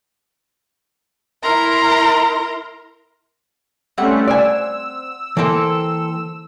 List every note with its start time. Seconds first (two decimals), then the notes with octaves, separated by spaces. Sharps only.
1.43 E4 A#4 A#5 C6
3.98 G3 A3 C4 C#4 F#5
4.28 D5 G#5 E6
5.37 E3 A#3 C4 A4